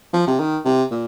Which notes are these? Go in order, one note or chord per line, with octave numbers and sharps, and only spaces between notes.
F3
C3
D#3
C3
A#2